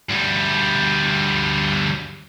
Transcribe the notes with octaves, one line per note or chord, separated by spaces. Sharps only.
D2 G3